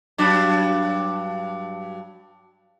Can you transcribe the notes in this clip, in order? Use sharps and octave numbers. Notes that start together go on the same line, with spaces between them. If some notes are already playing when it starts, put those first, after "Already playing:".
G2 F#3 D4